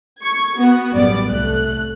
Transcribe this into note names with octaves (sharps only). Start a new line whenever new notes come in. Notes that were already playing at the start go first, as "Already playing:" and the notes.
C#6 G#6
B3 F#4
A1 F#2 G3 B3 D5
C2 A3 F#6